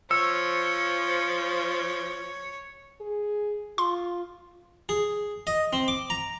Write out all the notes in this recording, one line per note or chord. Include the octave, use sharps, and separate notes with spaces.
F3 C#5 E6 C#7
G#4
F4 C6
G#4
D#5
C4
D6
A#5